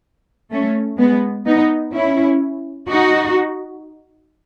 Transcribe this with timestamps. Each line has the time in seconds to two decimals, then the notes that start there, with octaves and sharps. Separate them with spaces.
0.51 A3 C#4
0.98 G#3 B3
1.46 B3 D#4
1.93 C#4 E4
2.87 D#4 F#4